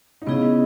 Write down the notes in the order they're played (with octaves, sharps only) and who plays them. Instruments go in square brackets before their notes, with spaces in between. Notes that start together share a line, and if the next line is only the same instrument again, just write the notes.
[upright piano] D#4
[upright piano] C#3 C#4 [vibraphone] B3 E4 G#4 D#5